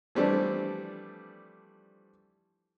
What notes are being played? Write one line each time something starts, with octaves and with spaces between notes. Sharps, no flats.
E3 F3 G3 A3 C4 D4